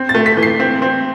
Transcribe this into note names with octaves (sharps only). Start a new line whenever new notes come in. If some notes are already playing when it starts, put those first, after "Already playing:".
Already playing: C4
A6
A3
B6
E3
C7
C4
C4